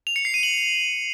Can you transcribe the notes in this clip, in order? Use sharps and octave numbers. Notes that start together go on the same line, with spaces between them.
F7
C#7
C7
D#7
F#7